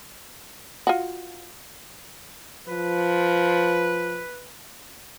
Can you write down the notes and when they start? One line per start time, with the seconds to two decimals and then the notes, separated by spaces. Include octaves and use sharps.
0.87 F4 F#4
2.68 F3 B4